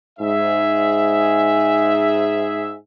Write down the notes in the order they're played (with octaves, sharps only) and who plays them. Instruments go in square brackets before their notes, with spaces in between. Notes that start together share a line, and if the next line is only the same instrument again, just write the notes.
[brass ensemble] G#2 G#4 E5